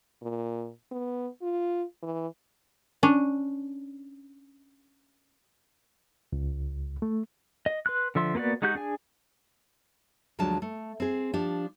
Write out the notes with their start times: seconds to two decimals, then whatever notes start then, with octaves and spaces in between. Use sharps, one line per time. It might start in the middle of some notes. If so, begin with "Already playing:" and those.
0.22 A#2
0.91 B3
1.42 F4
2.03 E3
3.03 C#4 D4
6.33 C#2
7.02 A3
7.66 D#5
7.86 B4 C6 F#6
8.15 D3 F3 E5 C6
8.35 A#3 B3 F#4 B4 D5
8.62 G#3 D#4 F#4 G4 G6
8.75 D4 G#4 G#5
10.39 D2 F3 F#3 G#3 D4 A5
10.62 A3
11.00 C4 G#4
11.33 F3 D4 G4